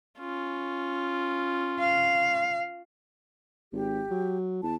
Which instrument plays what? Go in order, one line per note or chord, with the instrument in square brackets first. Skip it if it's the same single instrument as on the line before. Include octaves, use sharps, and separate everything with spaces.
[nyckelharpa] C#4 F4
[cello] F5
[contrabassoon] G#1 [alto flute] G4
[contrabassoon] F#3
[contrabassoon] E2 [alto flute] A5